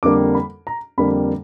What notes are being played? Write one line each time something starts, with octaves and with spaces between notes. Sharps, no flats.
F2 D3 G3 A#3 D6
B5
A#5
F2 D3 G3 A#3 B5